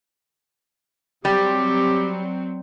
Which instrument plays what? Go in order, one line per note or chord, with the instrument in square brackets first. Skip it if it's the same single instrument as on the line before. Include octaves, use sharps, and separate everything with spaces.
[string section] F#3 C4 [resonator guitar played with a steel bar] G3 [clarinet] G4